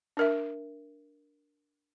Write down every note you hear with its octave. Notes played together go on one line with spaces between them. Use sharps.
D4 A#4 E5